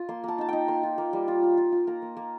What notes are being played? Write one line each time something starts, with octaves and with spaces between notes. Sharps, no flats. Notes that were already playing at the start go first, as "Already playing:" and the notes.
Already playing: F4
A#3 C6
A#3 A5
D#4 A5
D#4 G5
A#3 C6
F4
A#3
G3
F4
F4
F4
F4
A#3 A#5
A#3
A#3